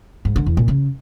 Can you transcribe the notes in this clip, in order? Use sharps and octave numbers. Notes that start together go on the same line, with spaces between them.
G#2
D3
E2
A#2
C#3